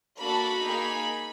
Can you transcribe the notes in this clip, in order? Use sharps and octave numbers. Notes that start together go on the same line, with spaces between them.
A#3 D4 F#4 A4 B5
A#3 D#4 G#4